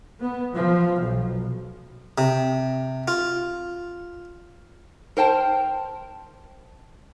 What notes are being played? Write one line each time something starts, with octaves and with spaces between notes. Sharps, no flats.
B3
F3
B1
C3
F4
A#4 C5 G5 A5